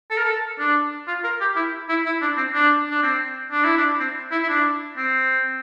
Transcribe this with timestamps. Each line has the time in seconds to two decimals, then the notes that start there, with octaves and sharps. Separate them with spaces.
0.11 A4
0.18 A#4
0.25 A4
0.59 D4
1.08 F4
1.24 A#4
1.41 G4
1.56 E4
1.89 E4
2.06 E4
2.22 D4
2.37 C4
2.54 D4
2.91 D4
3.03 C4
3.51 D4
3.64 E4
3.77 D4
4.00 C4
4.32 E4
4.43 E4
4.49 D4
4.97 C4